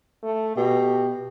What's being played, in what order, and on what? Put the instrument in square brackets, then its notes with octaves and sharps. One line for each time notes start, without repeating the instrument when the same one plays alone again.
[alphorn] A3
[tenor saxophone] B2 [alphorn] G4